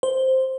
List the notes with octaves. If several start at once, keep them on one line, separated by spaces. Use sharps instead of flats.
C5